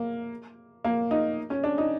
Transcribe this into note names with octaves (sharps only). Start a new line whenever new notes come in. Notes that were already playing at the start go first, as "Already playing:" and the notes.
Already playing: A#3
A#3
D#4
C#4
D4
D#4